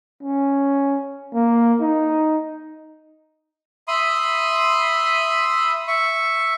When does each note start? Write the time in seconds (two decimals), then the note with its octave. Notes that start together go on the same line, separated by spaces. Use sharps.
0.23 C#4
1.34 A#3
1.81 D#4
3.88 E5 B5 C6 D#6
5.88 E5 C#6